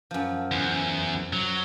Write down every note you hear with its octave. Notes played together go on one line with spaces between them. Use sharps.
F#2 F3
E2
F#3